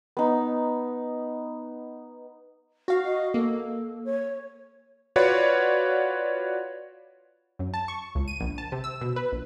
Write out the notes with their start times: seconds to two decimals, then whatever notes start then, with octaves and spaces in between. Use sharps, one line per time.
0.17 B3 D#4
2.88 F#4 F5
3.05 D#5
3.34 A#3 A4
4.04 C#5
5.16 F4 F#4 B4 C#5 D5 F#5
7.59 F#2
7.74 A5
7.88 C#6
8.15 C#2
8.28 D#7
8.41 A#1
8.58 A5
8.72 C3
8.84 E6
9.01 B2
9.16 B4
9.32 A#1